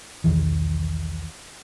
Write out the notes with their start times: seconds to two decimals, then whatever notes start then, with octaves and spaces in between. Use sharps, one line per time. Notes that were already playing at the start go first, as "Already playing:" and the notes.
0.24 B1 E2 D#3 E3